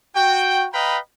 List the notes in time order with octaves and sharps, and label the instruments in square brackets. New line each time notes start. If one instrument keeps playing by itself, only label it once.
[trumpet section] F#4 G5
B4 D#5 F5 G5 A#5 B5